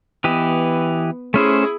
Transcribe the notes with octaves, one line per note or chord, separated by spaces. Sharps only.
E3 B3 G4 D#5
A3 C#4 E4 G#4 C5